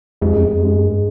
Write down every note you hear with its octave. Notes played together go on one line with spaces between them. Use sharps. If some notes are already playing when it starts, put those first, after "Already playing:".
F2 G#3
F#2
F2
F#2 G#3
G2